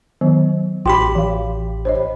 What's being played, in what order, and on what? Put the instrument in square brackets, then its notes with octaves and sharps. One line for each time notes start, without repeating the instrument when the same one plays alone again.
[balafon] D#3 F#3 B3
[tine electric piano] A1 G4 B5 [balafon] F#4 G5 C6
[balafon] E3 F5
C5 C#5 D#5